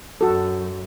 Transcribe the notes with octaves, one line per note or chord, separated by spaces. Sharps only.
F#2 F#4 A4